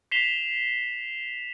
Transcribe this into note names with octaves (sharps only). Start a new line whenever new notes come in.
B6 C7 E7 F7 G7